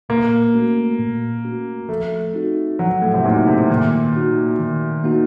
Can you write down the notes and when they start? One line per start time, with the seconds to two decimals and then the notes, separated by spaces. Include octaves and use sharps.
0.09 A#2 A#3
0.54 A3 C#4 F#4
0.99 A#2
1.45 A3 C#4 F#4
1.89 F3 A3
2.34 C4 D#4 F#4
2.79 F3 F#3
3.01 A2
3.14 C3
3.24 A#2 C4 D#4 F#4
3.47 C3
3.70 A#2 D#3
4.14 A#3 D#4 F#4
4.59 D#3
5.04 A#3 D#4 F#4